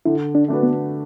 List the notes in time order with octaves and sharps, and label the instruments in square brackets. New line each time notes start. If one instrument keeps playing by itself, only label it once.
[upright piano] D3 [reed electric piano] E4
[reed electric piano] D4
[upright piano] A3 D4 F#4 B4
[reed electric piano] B3